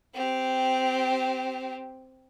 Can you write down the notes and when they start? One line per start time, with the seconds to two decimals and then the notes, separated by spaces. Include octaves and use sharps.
0.14 C4 G4